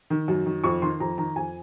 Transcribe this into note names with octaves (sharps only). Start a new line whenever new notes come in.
D#3
F#2
D#3
F2 C#6
D#3 C6
F2 A#5
D#3 A#5
F2 G#5